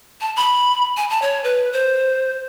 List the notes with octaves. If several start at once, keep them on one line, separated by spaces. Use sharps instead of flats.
A5
B5
G#5
A5
C#5
B4
C5